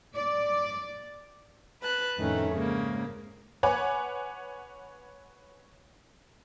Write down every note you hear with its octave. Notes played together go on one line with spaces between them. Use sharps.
D5
B4 A5 F#6
F2 A2 D#3 A3 C#4
G#2 C#3 A#3
B4 C#5 F#5 G#5 B5 D6